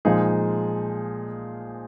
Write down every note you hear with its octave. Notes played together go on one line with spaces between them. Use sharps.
A#2 F3 G#3 D#4 G#4